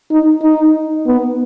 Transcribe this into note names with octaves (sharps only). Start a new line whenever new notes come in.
D#4
D#4
B3